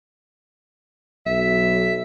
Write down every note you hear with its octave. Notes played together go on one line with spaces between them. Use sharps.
B1 E5